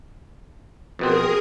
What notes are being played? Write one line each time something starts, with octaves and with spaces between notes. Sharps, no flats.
F2 B2 C4 G#4 A#4 D#6